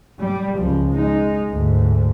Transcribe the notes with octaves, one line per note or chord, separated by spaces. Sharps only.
G3
C#2 F3
G#3 D#4
D2 G#2